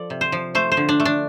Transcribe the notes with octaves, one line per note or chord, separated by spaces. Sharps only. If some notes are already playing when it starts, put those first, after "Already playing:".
Already playing: F3 A4 D5
C3
C5
F3
A3 C5
C5
D3
D4
A3
D4